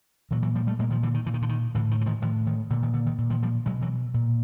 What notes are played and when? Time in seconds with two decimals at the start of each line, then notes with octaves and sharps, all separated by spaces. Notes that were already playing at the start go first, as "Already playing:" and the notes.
0.31 A#2 E3 F#3
0.43 E3 F#3
0.55 F3 G3
0.67 G3 A3
0.79 A#2 G#3 A#3
0.90 D#3 F3
1.03 D3 E3
1.14 D#3
1.26 A#2 E3
1.34 D#3
1.42 D3
1.49 D#3
1.74 A2 D3 E3
1.91 D#3
2.01 E3
2.06 D#3 F3
2.22 A2 D#3 F3
2.47 D#3
2.70 A#2 D3
2.83 D#3
2.94 D3
3.07 D#3
3.18 A#2
3.30 D#3 F3
3.43 F3 G3
3.66 B2 F#3 G#3
3.82 E3 F#3
4.14 A#2